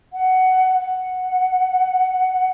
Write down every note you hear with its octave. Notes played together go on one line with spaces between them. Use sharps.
F#5
F#5